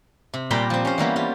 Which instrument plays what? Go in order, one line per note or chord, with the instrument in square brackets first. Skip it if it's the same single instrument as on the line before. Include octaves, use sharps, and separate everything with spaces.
[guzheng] C3
A#2 G3 G4 A#4 B5 C6
F3 C4
C#4 C5
E3 G3 A#3 B3
G3 F4